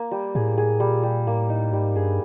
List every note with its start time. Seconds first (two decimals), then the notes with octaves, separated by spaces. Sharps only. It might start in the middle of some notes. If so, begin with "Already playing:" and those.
Already playing: A#3
0.11 G3
0.35 A2 G#4
0.58 G#4
0.80 A#2 G3
1.03 G3
1.27 A2 A#3
1.49 D#4
1.73 G#2 G3
1.96 G2 G#4